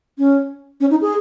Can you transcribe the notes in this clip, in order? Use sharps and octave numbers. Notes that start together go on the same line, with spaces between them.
C#4
C#4
D#4
G#4